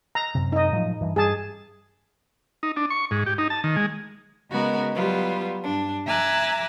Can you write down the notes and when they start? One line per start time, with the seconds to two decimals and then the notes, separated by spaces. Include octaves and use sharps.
0.15 A#5
0.35 F#2 C3
0.52 D#4 D#5
0.72 A2 F3 F#3
1.01 G2 E3
1.16 G2 G#4 A5
2.63 D#4
2.77 D4
2.90 C#6
3.11 G#2
3.26 G4
3.38 D#4
3.50 A5
3.64 D#3
3.76 G#3
4.50 C#3 G#3 B3 F#4 A#4
4.95 F#3 G3 B3 F4
5.62 G2 D4
6.06 E5 G#5 A#5 D6 E6 F#6